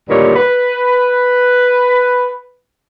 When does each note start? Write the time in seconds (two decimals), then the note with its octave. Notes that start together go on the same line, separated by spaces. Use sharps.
0.09 D2 G2 A#2 D#3 G3 C#5
0.36 B4